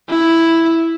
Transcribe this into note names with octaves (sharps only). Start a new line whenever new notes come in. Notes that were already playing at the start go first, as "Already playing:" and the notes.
E4